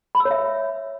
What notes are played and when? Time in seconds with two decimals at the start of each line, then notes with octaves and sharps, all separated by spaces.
0.15 B5
0.20 E6
0.25 C#5
0.31 E5